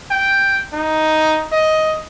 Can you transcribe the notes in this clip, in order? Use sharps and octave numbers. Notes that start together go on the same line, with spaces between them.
G5
D#4
D#5